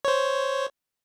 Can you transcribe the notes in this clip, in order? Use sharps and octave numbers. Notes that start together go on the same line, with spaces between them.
C5 C#5